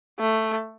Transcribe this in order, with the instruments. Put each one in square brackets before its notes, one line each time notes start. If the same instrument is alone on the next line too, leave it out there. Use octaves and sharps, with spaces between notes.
[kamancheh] A3